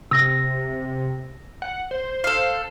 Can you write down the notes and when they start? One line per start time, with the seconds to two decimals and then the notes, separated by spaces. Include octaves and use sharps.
0.11 C3 E6 A#6
1.62 F#5
1.91 C5
2.24 A4 F5